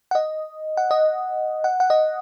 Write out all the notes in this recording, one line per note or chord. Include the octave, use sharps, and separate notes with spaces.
F#5
D#5
F#5
D#5
F#5
F#5
D#5